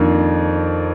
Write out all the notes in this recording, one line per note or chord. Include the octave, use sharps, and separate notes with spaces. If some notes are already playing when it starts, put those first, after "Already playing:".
Already playing: F2 D#3 A#3 D4